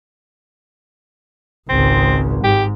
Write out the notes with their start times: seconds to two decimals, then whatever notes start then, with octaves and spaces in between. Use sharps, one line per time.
1.69 G#1 C#2 C4
2.44 G#2 G4